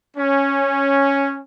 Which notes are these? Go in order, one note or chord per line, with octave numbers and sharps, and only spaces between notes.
C#4